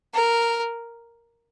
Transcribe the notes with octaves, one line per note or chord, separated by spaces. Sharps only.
A#4